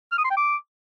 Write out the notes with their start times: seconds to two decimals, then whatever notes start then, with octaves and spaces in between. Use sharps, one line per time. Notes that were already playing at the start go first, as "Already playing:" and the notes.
0.12 F6
0.18 D#6
0.24 C6
0.31 G5
0.37 D6